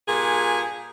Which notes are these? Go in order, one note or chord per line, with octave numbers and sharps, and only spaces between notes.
G2 A#2 G#4